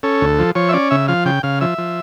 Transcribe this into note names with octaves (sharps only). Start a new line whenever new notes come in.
C#4 A4
D2
F3
F3 C#5
E5
C#4 D5
C#3 E5
F3 F5
C#3 G5
C#3 F5
F3 E5
F3